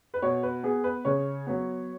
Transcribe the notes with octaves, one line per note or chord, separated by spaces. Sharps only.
B4
B2 C#5
B4
B3 G#4
B4
C#3 C#5
F#3 B3